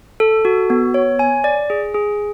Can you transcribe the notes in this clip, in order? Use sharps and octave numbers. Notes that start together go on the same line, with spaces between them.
A4
F#4
B3
C#5
G#5
D5
G#4
G#4